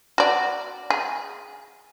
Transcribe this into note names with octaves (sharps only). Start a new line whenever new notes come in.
F#4 D5
G#4